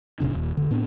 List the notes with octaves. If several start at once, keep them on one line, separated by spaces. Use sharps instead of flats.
F1 A#2 C#3 D4
D#1 D#2
F1 D3
A2 B3 C4 D4